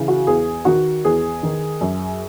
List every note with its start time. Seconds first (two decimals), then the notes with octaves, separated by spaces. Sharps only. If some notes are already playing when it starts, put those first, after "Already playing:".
Already playing: C#3 E3
0.08 F#4
0.27 E2 G#4
0.65 D#3 F#4
1.04 E2 G#4
1.43 D#3
1.81 F#2